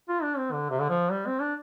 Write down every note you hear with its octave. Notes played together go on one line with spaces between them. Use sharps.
F4
D4
C4
D3
C3
D3
F3
G3
C4
D4